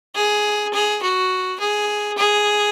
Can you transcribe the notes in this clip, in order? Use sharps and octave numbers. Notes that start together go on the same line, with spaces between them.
G#4
G#4
F#4
G#4
G#4